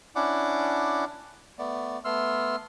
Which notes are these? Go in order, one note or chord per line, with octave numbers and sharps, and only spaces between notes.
C#4 D4 E4 D5 F#5 D6
A3 B3 D5
A3 B3 C6 E6 F6